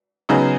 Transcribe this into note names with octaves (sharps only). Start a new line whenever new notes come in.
C#3 F#3 B3 D#4 G#4